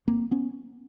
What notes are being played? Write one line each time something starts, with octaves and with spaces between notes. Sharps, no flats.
G1 A#3 C4
B3 C#4